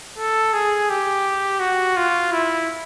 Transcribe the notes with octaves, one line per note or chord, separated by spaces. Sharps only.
A4
G#4
G4
F#4
F4
E4